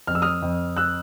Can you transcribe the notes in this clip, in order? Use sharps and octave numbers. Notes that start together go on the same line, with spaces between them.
F2 F6
E6
D#6 F6
F2
E6 F#6